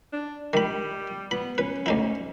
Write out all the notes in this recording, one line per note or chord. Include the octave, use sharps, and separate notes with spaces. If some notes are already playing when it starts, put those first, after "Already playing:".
D4
D#3 G3 B5
B3 B5
C#4 B4
D2 D#4 E4